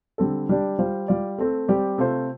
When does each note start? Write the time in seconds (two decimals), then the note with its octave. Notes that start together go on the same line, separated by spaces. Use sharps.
0.18 D3 G3 C4 A4
0.49 G3 D4 G4 D5
0.79 G3 F4 C5
1.08 G3 F4 D5
1.38 A3 C4 A4
1.68 G3 C4 G4 D5
1.98 C3 A3 F4 C5